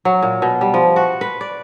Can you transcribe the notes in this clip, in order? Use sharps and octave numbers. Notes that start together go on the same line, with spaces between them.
F#3
A#2
B2
G3
F3
F#4
B4
D5